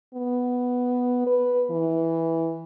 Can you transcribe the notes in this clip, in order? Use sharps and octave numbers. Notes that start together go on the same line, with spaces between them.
B3
B4
E3